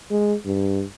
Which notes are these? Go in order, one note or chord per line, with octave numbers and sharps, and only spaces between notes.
G#3
G2